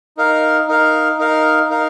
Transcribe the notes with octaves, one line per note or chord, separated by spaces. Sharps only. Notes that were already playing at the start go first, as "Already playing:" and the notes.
D#4 A#4 F5
D#4 A#4 F5
D#4 A#4 F5
D#4 A#4 F5